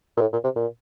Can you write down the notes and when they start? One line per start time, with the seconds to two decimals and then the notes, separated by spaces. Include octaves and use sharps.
0.17 A#2
0.21 A2
0.33 A#2
0.44 C3
0.56 A#2